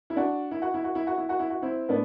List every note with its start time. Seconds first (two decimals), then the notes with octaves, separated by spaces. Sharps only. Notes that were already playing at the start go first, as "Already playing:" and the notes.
0.10 E4
0.16 D4 F#4
0.51 E4
0.62 F#4
0.74 E4
0.84 F#4
0.95 E4
1.07 F#4
1.17 E4
1.29 F#4
1.39 E4
1.50 F#4
1.62 C4 E4
1.89 A2 B3 D4